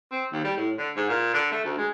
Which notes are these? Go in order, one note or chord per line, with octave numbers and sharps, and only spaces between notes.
C4
D#2
G3
A2
D3
G#2
A#2
D3
A3
D2
G#3